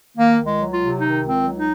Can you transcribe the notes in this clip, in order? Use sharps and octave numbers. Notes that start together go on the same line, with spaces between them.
D#3 A#3
C#2
G#3
F#3
F4
C3
D#3 D#4
C#2
C4
F#3
D#4